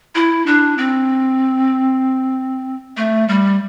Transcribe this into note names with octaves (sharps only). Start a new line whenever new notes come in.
E4
D4
C4
A3
G3